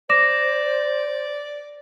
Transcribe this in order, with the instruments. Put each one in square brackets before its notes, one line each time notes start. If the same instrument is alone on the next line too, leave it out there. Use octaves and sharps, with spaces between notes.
[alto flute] C5 [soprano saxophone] D5 [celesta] D6 A#6 E7